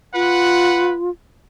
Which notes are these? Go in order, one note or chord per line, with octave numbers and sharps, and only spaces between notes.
F4 B4 F#5